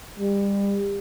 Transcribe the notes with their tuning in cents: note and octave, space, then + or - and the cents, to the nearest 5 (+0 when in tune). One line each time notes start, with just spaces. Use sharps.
G3 +30